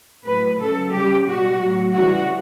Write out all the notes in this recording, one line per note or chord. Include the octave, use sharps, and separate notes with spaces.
A2 F#3 B4
C#3 F#3 A4
C#3 G3 G4
B2 G3 F#4
A2 F#3
C#3 E3 G3 F#4